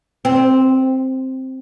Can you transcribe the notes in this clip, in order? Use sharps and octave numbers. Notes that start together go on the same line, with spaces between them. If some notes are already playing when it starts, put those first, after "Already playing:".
C4